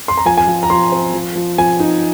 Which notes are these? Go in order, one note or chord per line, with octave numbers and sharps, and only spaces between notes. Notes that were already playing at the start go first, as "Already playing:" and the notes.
C6
A#5
F3 G#5
G#5
F3
A#5
F3 C6
C4
F3
F3
F3 G#5
D#4